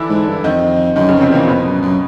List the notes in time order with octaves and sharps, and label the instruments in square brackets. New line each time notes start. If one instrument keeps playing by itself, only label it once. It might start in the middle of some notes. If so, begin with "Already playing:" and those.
Already playing: [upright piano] D3 E3 D4 E4
[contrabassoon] G#2
G2
[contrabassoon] F2 [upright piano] D#3 D#4
[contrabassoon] F#2 [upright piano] D#3 D#4
[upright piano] C#3 C#4
[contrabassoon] F2
[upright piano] C3 C4
[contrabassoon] E2 [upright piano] A#2 A#3
[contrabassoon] F2 [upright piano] B2 B3
[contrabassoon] F#2
F#2